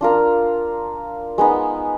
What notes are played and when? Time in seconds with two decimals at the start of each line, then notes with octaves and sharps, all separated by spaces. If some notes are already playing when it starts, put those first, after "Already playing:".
0.01 D4 F4 A#4
1.38 G#3 B3 D#4